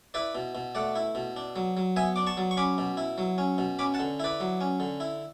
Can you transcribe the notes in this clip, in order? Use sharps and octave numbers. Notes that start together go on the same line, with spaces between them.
E4 B4 D5
B2
B2
A3 D5 F#5
E4
B2
D4
F#3
F#3
B3 E5 G#5
D4 D6
A5 C#6
F#3
C#6
C#4 B5 D6
B2
E4
F#3
C#4
B2
C#4 B5 D6
F#5 A5
D3
E4 B4 D5
F#3
C#4
D3
E4